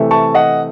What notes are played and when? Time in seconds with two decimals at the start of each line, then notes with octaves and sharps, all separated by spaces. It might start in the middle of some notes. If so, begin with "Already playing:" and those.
Already playing: C3 E3 A3
0.11 A5 C#6
0.35 D#5 F#5